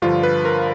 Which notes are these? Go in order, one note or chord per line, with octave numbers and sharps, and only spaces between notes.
G2 D3 F3 F4
B4
A#4